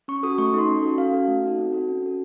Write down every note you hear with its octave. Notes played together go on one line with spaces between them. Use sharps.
C#4 C#6
F#4 A4 D#6
A3 C#6
D#4 A4 C6
C#4
F#4 A4
C#4 F5
F#4 A4
A3
D#4 F#4 A4
C4
F#4 A4
C#4
F#4 A4